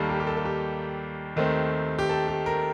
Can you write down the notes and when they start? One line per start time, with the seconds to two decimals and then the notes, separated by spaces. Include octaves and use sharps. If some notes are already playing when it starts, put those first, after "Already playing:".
Already playing: D#2 D#3 G3 A#3 A4
0.09 G4
0.20 G4
0.27 A4
0.37 A4
0.45 G4
1.36 D#2 D#3 A3 C4
1.99 G4
2.09 A4
2.28 G4
2.46 A#4